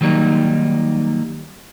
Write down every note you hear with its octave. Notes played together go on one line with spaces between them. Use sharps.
D#3 F#3 G3 A#3 D#4